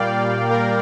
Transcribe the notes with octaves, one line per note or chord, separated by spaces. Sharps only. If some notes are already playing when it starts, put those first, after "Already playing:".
Already playing: A#2 G3 A#3 D5 F5 G5
A#4